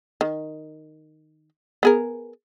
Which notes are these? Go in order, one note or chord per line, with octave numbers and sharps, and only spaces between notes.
D#3
B3 G#4 A#4